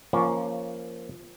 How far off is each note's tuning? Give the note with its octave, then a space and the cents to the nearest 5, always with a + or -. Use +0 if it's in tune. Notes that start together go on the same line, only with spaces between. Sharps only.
F3 -10 A#3 +5 C#4 +0